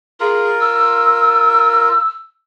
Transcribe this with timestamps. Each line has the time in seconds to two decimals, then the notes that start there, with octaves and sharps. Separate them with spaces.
0.20 F4 G#4 A#4
0.60 E6